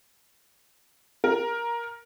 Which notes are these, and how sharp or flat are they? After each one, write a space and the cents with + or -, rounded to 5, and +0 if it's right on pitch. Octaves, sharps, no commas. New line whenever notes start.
A#4 +10